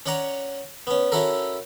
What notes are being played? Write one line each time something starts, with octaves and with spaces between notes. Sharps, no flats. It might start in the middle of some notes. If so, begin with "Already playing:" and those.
C#4 C#5 D5 F#5 A#5
B3 C#4
C#4 E4 F#4 A4 A#4